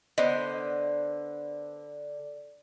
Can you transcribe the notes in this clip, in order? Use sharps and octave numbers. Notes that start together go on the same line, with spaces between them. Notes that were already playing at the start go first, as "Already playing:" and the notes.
D3 B3 C5 D#5